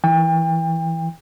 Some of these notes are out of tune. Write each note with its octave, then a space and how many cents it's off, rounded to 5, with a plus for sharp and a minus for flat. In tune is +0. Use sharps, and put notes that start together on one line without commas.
E3 +0 G5 +35